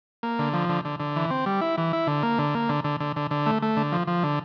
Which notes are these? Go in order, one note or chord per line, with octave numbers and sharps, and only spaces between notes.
A#3
D3
F3
D3
D3
D3
E3
C4
G3
E4
E3
E4
D3
A#3
D3
A#3
D3
D3
D3
D3
D3
A3
A3
D3
F3
F3
D3